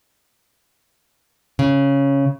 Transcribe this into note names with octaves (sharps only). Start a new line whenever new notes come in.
C#3